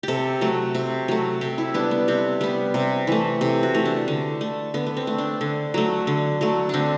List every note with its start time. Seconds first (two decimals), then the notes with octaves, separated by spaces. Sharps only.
0.03 C3 G4 A4
0.41 F#3 A3
0.75 C3
1.08 F#3 A3
1.41 C3 G4
1.58 E4
1.74 G3 B3 D4
1.91 B3
2.08 C3 C4
2.41 G3 B3
2.74 C3
3.07 E3 A3
3.41 C3
3.63 F#4
3.74 E3 A3
3.85 D4
4.08 D3
4.41 A3
4.74 D3 B3
4.87 B3
4.97 C4
5.07 A3
5.18 D4
5.41 D3
5.74 F#3 A3
6.07 D3
6.41 F#3 A3
6.69 D3 C4 D4